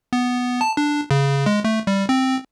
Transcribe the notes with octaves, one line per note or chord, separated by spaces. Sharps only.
B3
A5
D4
C#3
G#3
A3
G3
C4